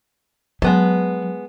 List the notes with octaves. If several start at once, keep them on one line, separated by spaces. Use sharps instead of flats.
F#3 G#3 B3 A5